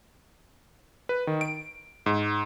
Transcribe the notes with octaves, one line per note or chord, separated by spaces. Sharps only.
B4
D#3
D7
G#2